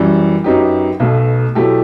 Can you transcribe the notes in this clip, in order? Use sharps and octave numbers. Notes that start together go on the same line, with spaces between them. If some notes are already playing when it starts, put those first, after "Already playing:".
Already playing: F#2 E3 G3
F#2 F#3 B3 D#4 G4
B1 B2 A3
B2 F#3 A3 E4 G4